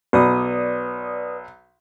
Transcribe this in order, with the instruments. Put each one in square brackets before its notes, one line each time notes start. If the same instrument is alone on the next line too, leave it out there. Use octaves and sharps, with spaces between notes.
[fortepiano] B1 [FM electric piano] B4 D5 D#6